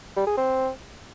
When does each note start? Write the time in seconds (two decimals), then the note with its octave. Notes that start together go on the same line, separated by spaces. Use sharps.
0.16 G3
0.27 G#4
0.37 C4